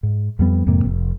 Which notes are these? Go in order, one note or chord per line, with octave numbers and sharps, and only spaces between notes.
G#2
F2 G3 B3
F2 G#2 C3 A#3
F1